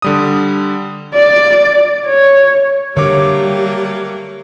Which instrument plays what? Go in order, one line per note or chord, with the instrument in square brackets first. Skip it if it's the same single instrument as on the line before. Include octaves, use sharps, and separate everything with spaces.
[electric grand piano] D3 G3 D#6
[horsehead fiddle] D5
C#5
[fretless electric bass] D3 [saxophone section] F#3 A3 A#3 [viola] G3 [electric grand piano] C#5 D6